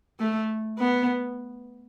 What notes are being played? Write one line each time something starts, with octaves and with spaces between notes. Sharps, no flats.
A3
B3